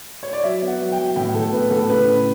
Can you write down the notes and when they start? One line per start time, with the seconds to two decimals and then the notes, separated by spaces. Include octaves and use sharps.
0.23 C#5
0.33 D5
0.43 F#3 E5
0.62 B3
0.67 F#5
0.80 F#3
0.92 G5
0.98 F#3
1.16 A2 G5
1.34 A2 A4
1.52 B3 B4
1.71 A2 A4
1.89 C#3 B4
2.07 C#3